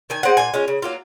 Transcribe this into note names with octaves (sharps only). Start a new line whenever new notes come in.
D#3 G#5
G#3 C4 F#5
A#2 G#5
G#3 C#4 F4
C#3
F#3 A#3 F4